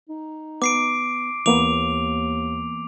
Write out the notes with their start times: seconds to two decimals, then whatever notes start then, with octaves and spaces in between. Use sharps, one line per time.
0.10 D#4
0.62 B3 D6 C7 D7
1.46 D#2 E3 A#3 B3 D6 F7